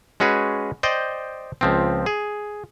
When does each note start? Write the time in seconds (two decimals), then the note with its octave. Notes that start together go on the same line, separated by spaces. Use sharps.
0.20 G#3 C#4 F#4 G#4 B4
0.83 C5 D5 D#5 G5
1.61 C#2 F3 C4
2.06 G#4